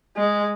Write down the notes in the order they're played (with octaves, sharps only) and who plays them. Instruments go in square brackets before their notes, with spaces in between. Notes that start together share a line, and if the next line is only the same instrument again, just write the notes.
[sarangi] G#3